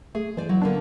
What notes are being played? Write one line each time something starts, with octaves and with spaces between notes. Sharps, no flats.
A3 G#4
E3 C5 D5 G#5
F#3 E4
D3 A#3 B3 D4